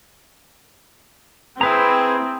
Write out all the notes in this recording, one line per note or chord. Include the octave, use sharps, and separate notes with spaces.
C4 E4 G#4 B4 A#5